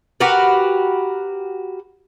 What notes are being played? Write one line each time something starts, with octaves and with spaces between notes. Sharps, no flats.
F#4 G4 A#4 B4